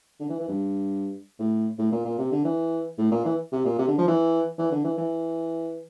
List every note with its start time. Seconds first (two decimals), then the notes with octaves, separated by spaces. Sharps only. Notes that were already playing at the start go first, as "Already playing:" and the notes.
0.20 D3
0.29 E3
0.39 E3
0.48 G2
1.39 A2
1.79 A2
1.92 A#2
2.05 A#2
2.18 C3
2.32 D3
2.45 E3
2.98 A2
3.11 A#2
3.25 E3
3.52 C3
3.65 A#2
3.79 C3
3.88 D3
3.98 F3
4.08 E3
4.58 E3
4.72 D3
4.84 E3
4.98 E3